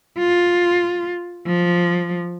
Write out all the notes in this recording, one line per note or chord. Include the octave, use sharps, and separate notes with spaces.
F4
F3